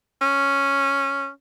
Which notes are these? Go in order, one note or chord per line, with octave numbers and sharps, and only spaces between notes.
C#4